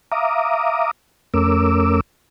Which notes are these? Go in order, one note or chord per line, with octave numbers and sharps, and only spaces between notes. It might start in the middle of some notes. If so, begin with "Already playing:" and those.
E5 F5 A#5 D6 D#6
F2 A3 C#4 A#4 D6 E6